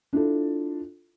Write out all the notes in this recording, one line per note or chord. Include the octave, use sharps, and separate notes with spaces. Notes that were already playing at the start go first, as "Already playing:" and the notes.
D4 E4 F4 A4